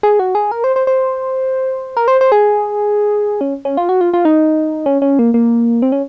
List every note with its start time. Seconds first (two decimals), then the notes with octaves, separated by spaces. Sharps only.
0.03 G#4
0.19 F#4
0.35 G#4
0.51 A#4
0.64 C5
0.76 C5
0.87 C5
1.97 A#4
2.08 C5
2.21 C5
2.32 G#4
3.41 C#4
3.65 C#4
3.77 F4
3.89 F#4
4.01 F4
4.14 F4
4.25 D#4
4.86 C#4
5.02 C#4
5.19 A#3
5.34 A#3
5.82 C4
5.92 C#4